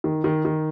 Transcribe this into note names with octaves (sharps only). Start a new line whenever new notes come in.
D#3
D#3
D#3